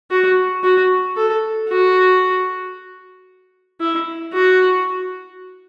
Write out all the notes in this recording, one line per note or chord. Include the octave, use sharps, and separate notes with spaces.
F#4
F#4
A4
F#4
E4
F#4